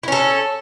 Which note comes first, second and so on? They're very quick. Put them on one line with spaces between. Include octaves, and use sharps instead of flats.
E4 C#4 A4